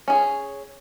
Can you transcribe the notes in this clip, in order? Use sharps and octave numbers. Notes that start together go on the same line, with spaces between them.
C#4 G#4